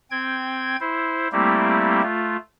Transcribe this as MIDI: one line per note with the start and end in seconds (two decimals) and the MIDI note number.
0.11 0.76 60
0.11 0.76 79
0.11 0.76 92
0.80 1.28 64
0.80 1.28 72
1.32 2.02 55
1.32 2.02 57
1.32 2.02 58
1.32 2.02 60
1.32 2.02 64
1.32 2.02 67
2.03 2.37 57
2.03 2.37 65